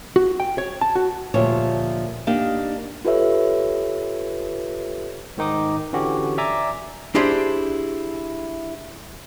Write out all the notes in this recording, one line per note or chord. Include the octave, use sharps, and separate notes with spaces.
F#4
G5
C#5
A5
F#4
D2 A#2 F3 G4 C#5
A#3 D4 D#4 G4
F4 G4 A4 B4 C#5 E5
G#2 D#3 D#4 D6 D#6
D3 E3 C#4 F#4 G4
D5 E5 G#5 A#5 D6
D4 E4 G4 G#4 C5